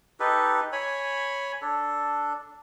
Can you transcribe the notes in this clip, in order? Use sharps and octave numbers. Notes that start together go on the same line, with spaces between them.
D#4 G4 A4 B4
C#5 G#5 B5
D4 A4